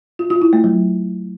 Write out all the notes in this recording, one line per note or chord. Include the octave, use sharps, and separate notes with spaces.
F4
F4
E4
A3
F#3